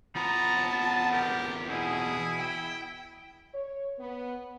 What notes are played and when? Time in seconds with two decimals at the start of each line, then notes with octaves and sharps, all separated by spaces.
0.16 E2 B3 F4 A5 A#5
1.11 G4 A#4
1.69 B2 E4 G#4
2.40 G5
3.54 C#5
3.99 B3